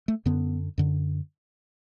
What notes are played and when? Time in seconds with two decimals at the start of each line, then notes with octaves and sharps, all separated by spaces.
0.08 A3
0.26 F#2 D3 B3
0.78 F#2 D3